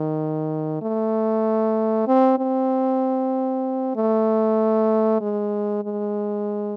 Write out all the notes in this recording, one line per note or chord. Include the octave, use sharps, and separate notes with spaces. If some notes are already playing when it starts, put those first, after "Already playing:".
Already playing: D#3
A3
C4
C4
A3
G#3
G#3